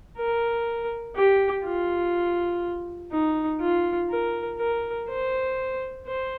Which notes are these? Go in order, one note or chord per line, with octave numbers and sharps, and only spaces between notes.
A#4
G4
F4
D#4
F4
A#4
A#4
C5
C5